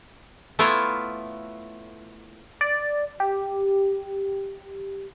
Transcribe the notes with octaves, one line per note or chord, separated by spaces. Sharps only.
A3 B3 E4 F4 C#5 F5
D5
G4